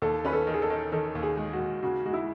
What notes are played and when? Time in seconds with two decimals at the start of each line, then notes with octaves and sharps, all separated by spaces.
0.02 D#2 A4
0.25 C#4 B4
0.33 A4
0.47 D#3
0.54 G#4
0.62 A4
0.70 D#3
0.92 D#3 A4
1.15 D#2
1.23 G#4
1.37 G#3
1.53 F#4
1.59 D#2
1.83 C#3 F#4
2.06 G#3 F#4
2.13 E4